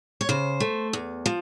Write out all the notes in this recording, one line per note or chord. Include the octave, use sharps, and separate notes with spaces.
C#5
C#3 C5
A3
E2
F3